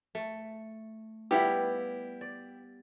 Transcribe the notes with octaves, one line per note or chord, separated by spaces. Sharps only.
A3
G3 B3 E4 G4 F5
D5